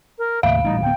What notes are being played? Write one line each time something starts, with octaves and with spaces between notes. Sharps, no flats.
A#4
D#2 A2 C#3 E5 F5
A1 A#2 G3 D#4
D1 B3 G5